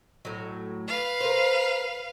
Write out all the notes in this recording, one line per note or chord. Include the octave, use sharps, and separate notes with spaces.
A2 F#3
B4 F5
A#4 C5